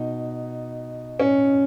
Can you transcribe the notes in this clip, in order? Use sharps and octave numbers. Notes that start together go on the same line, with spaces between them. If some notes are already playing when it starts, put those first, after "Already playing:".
Already playing: B2 D#4
C#4